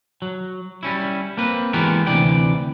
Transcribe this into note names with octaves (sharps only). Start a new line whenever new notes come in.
F#3
G3 C#4 E4
A#3 C4 B4
E3 G#3 B3 F#4 G4 A#4
D2 C3 E3 D5 G5